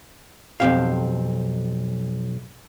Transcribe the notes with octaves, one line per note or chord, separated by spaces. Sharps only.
B1 F2 B2 C4 G4 F5